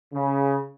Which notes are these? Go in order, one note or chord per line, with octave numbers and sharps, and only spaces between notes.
C#3